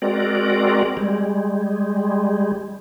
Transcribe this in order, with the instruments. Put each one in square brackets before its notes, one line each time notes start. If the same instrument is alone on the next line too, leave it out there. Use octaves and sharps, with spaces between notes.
[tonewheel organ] G#3 C4 F#4 A#4 D5
G3 G#3